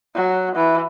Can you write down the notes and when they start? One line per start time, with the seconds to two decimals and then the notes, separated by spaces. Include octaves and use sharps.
0.15 F#3
0.55 E3